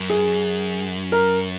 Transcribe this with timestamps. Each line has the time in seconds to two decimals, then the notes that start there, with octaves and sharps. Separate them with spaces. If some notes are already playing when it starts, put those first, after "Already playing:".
Already playing: F#2
0.10 G#4
1.12 A#4